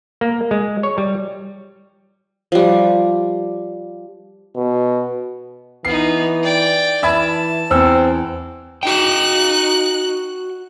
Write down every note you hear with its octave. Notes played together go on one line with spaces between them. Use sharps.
A#3
G#3
C#5
G3
F3 G3
B2
E3 B3 D#4 C7
D5 G5
E3 E5 A5 B5 G#6
E2 C4 E6
D#4 F#4 G5 F#6